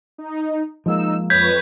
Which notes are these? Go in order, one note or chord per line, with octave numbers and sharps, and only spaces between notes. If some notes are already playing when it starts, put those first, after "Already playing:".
D#4
F3 G#3 A#3 D#4 E6
F2 B4 C#5 G6 G#6 B6